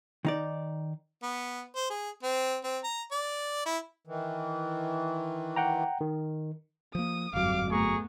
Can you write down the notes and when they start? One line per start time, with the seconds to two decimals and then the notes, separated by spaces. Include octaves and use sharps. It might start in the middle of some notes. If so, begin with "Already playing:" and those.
0.25 D#3 D#4 D5
1.23 B3
1.76 C5
1.90 G#4
2.23 C4
2.64 C4
2.84 A#5
3.11 D5
3.66 E4
4.07 D#3 E3
5.56 F#5 G5 A#5
6.01 D#3
6.95 F3 A#3 D#6
7.34 G1 F2 G#2 F#3 G3 F5 D6
7.71 A3 B3 G#4 A#5 C#6